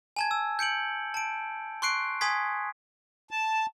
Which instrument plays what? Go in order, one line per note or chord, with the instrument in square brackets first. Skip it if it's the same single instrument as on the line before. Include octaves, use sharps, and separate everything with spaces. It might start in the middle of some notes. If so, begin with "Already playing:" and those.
[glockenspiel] G#5 A5 G#6
E6
G6 C#7 D7 F#7
A5 D7
C6 C#6 F#6 C7 D7
G#5 C6 D#6 G#6 B6
[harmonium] A5